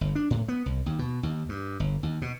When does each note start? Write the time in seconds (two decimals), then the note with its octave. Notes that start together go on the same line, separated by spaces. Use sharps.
0.01 G1
0.15 D4
0.30 A2
0.48 B3
0.66 C2
0.86 D#2
0.99 B2
1.23 D#2
1.49 G2
1.80 G1
2.03 D#2
2.22 B2